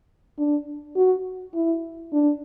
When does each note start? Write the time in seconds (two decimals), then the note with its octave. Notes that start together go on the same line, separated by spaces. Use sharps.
0.38 D4
0.96 F#4
1.55 E4
2.13 D4